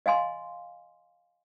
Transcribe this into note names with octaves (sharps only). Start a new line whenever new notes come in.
D#5 F5 G#5 C6